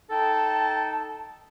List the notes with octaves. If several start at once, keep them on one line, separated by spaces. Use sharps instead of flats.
D#4 A4 G5 A5